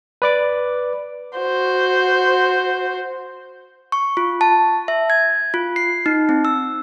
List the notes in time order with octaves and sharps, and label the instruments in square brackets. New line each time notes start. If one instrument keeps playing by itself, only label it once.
[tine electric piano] B4 D5 D6
[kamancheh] F#4 C5
[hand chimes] C#6
F4
A5
E5
G#6
F4
C7
D#4
C4
E6